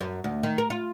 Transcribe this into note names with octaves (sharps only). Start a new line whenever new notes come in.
F#2
D2
D#3
A#4
F4